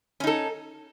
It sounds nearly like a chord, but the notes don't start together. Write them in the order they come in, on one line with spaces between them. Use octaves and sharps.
C#4 D#4 A4